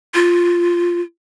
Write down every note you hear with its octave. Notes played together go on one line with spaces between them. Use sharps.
F4